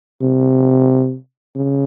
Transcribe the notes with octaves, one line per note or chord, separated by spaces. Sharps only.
C3
C#3